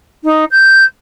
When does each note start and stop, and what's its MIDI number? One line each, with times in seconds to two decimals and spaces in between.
0.24 0.45 63
0.51 0.84 91